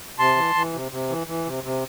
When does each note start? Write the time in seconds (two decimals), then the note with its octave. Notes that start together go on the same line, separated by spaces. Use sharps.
0.19 C3 A5 C6
0.36 E3
0.55 E3
0.73 C3
0.92 C3
1.09 E3
1.27 E3
1.46 C3
1.64 C3